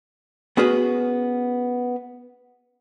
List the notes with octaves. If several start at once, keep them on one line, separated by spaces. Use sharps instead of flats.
B3 C#4 F#4 G#4 B4